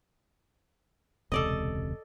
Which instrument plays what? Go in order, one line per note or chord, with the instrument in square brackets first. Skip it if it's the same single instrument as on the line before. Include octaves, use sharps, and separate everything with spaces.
[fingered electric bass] E1 C#2 C3 [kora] A4 D5 D#5